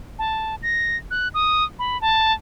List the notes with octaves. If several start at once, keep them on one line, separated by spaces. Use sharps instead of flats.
A5
A#6
F#6
D#6
B5
A5